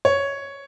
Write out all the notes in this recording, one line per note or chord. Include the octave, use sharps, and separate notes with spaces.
C#5